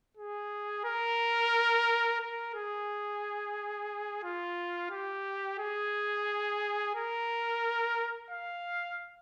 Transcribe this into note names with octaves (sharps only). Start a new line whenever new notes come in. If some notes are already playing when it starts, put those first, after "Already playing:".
G#4
A#4
A#4
G#4
F4
G4
G#4
A#4
F5